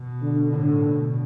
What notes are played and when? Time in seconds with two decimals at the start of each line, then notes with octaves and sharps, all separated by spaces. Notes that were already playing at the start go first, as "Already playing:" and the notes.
Already playing: B2
0.22 D3
0.52 A2 D3
0.83 B2